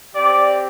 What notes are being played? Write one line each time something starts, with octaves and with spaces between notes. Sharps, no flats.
C4 G4 D5